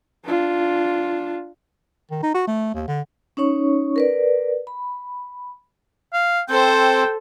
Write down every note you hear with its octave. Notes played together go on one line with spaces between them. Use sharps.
D4 F4
D#3
D#4
F#4
A3
D#2
D3
C#4 D#4 C#5 C#6
A#4 B4 D5
B5
F5
C4 A4 C5 G5